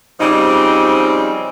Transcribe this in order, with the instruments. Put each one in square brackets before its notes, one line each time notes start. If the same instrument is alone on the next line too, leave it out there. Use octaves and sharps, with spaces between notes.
[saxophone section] C#3 F3 G3 C4 D#4